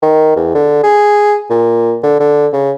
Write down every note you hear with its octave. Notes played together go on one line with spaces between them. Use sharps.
D#3
E2
D3
G#4
A#2
D3
D3
C#3